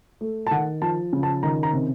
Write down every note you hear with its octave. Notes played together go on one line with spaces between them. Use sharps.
A3
A5
D#3 F#5
F3 A5
C#3
A5
D#3 A#5
A#5
C3